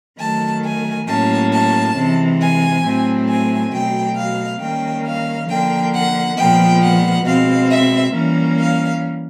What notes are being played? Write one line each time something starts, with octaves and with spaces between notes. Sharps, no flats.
D#3 F#3 A3 A5
G#5
A2 F#3 A#3 C#4 A5
A5
C3 E3 G#3
G#5
A2 F#3 A3 C4
G#5
B2 F#3 A3 G5
F5
D#3 G3 A#3 C#4 G5
F5
D3 F3 A#3 G5
F#5
A#2 F3 G#3 B3 G5
F#5
B2 G#3 C4 F5
E5
E3 G3 A#3 C#4
F5